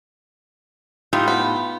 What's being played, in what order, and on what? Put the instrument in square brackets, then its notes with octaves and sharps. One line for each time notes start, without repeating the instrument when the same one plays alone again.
[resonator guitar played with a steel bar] A2 D#4 G4 [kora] F4
[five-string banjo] B3